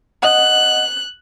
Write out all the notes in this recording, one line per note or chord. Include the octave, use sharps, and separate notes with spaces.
D#5 F#5 F#6